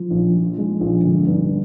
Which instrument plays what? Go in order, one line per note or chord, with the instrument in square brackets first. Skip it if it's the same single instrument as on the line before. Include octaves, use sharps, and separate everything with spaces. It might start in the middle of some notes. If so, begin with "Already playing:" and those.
Already playing: [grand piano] F3
A#1
F3
G#3
A#1
G1
G2